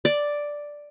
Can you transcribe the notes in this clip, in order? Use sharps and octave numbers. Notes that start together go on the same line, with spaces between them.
D5